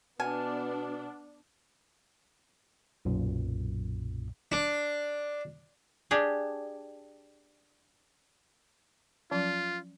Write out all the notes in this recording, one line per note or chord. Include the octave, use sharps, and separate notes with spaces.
B2 B3 D4 F#5 G#5 A5 F6
B1 F#2 A#2
D4
D4 G4 G#4
F3 F#3 C#4 F4